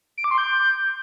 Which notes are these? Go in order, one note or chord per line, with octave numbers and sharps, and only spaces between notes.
D7
D6
C6
G6